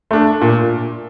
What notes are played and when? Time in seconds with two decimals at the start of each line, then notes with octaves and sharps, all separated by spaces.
0.11 A3 D4
0.41 A#2